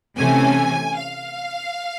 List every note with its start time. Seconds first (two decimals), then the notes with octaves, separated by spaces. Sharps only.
0.17 C3 E3 A3 C#4 G#5
0.95 F5